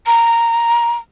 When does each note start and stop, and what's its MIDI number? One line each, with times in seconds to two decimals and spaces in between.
0.07 0.96 82